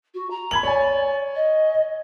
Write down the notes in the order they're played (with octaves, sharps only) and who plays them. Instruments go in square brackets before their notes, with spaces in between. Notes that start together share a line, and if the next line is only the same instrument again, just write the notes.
[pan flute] F#4
A#5
[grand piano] B5 G#6 F#7
[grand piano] C#5 G#5 [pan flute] D5
[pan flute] D#5